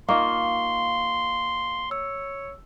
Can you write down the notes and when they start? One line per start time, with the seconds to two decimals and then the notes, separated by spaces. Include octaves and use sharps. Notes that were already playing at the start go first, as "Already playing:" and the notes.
0.09 A#3 D#4 F4 F5 C6 C#6
1.91 C#5 E6